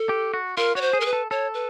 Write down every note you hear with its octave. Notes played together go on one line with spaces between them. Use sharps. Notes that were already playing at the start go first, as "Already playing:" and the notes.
Already playing: A4
G4
F#4
F4 A#4
F#4 C#5
C5
G#4
A#4
B4
A4
A4 C#5
B4